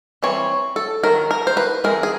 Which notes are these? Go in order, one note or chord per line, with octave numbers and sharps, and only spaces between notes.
E3 G3 C4 C#5
A4
D#3 F#3 A#4
A#4
C5
B4
E3 G#3 C4 A#4
G#4